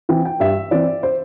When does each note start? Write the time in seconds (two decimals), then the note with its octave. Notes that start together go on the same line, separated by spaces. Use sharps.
0.09 E3 C4 G5
0.25 G5
0.40 G2 E5
0.71 E3 C4 D5
1.03 C5